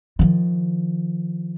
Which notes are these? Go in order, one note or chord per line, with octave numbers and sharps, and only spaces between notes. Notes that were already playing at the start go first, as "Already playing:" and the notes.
D#3 F3